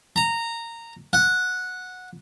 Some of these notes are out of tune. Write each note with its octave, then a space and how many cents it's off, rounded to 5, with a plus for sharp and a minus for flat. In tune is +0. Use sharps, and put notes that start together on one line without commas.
A#5 -15
F#5 -10